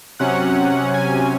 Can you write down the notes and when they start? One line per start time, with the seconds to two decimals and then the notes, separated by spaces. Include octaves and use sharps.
0.19 C3 F#3 C#4 F#5
0.94 G#5